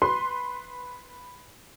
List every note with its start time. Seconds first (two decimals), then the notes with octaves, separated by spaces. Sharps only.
0.02 B4 C6